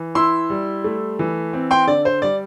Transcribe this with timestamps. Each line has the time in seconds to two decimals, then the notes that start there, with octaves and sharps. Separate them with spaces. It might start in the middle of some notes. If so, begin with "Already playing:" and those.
Already playing: E3
0.15 E4 C6 E6
0.50 G3
0.84 A3
1.19 E3
1.53 C4
1.71 G5 C6
1.87 D3 D5
2.05 C5
2.22 G3 D5